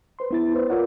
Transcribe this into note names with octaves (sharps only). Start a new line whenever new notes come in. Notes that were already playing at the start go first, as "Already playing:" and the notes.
B4 C5 C6
B3 E4 A6
B4 C5 D5
F4 A#4 B4 C#5 D5 F#5